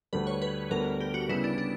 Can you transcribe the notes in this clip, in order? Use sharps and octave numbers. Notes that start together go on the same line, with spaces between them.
D2 D3 G3 B4
C#5
B4
D2 D3 G3 B3 A#4
G4
F#4
C#3 G3 B3 E4
D4
D4